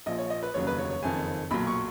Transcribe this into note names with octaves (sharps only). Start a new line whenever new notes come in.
A#1 A#2 F3 D#5
C#5
D#5
B4
F1 D#2 C#3 F#3 C#5
B4
C#5
C#5
F#1 F2 D#3 G#5
B1 A#2 F#3 B5
C#6